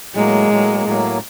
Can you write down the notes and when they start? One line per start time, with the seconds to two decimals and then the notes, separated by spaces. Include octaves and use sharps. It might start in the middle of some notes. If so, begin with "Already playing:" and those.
0.15 A2 F#3 G#3 A#3
0.50 A2 F#3 A#3
0.86 A2 F#3 A#3